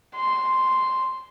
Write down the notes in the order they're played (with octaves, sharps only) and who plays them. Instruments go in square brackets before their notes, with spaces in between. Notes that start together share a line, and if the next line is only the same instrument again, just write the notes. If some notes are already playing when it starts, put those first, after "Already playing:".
[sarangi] C6